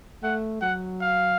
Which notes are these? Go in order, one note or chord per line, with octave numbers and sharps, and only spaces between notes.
A3 F#5
F#3 F#5
F5